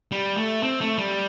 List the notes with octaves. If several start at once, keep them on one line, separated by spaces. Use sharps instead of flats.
G3
A3
C4
A3
G3